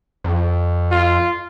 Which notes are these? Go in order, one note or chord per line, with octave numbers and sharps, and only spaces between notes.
F2
F4